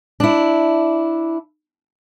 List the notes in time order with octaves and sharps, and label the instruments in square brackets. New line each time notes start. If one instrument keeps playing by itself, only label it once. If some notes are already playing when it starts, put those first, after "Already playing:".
[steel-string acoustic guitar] D4 E4